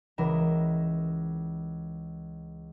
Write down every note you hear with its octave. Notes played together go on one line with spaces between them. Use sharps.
C#2 E3 A#4 D#5 E7